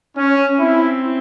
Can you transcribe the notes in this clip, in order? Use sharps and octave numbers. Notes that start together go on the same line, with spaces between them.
C#4
C4 E4